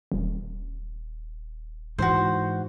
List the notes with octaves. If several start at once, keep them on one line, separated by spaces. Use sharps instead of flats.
D#1
G#2 E3 F#4 C5